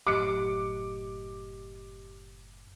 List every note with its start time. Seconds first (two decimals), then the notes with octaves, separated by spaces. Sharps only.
0.07 F#1 A2 F#3 G4 D#5 D6 F#6 C#7